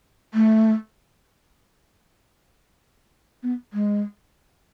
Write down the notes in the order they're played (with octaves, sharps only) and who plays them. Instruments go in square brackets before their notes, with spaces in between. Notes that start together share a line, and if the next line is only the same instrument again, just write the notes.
[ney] A3
B3
G#3